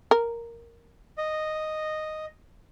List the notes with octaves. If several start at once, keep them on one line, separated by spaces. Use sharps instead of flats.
A#4
D#5